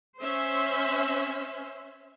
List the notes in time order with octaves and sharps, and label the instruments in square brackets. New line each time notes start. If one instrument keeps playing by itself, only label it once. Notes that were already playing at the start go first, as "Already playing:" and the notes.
[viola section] C#4 C5 E5